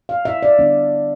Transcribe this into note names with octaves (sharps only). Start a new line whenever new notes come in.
F5
E5
D5
D3 G3 B3 D4